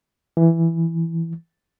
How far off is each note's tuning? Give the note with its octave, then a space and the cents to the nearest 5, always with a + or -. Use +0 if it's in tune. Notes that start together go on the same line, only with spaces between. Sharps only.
E3 +5